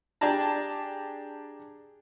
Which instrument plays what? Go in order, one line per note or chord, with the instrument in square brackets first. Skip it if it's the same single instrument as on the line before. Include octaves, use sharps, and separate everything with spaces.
[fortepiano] D4 G4 G#4 D5 A5 A#5